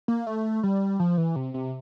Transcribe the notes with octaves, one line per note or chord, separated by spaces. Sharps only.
A#3
A3
G3
F3
E3
C3
C3